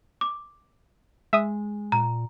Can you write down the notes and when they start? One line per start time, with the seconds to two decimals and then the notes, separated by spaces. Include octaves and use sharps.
0.21 D6
1.33 G#3 E5 D#6
1.92 A#2 A#5